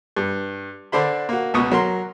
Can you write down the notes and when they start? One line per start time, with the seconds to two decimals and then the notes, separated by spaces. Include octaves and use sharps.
0.17 G2
0.92 D3 D4 C5 B5
1.29 A#3 F#4
1.54 C#2 B2 C#6 D#6
1.72 F#3 A#4 C6